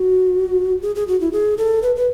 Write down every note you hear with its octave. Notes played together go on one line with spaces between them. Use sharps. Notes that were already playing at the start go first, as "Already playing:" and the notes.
Already playing: F#4
G#4
G#4
F#4
E4
G#4
A4
B4
B4